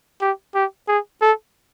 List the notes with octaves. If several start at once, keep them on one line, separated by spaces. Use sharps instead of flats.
G4
G4
G#4
A4